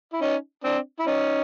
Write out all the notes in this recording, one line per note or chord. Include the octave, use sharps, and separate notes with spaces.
E4
C#4 D#4
C4 D4
E4
C#4 D#4